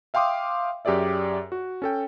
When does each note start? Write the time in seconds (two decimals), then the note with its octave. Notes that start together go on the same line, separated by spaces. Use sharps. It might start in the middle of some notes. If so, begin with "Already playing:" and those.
0.14 E5 F5 G5 C6 D6 D#6
0.85 F#2 G4 G#4 D5 E5
1.52 F#4
1.82 C#4 A4 G5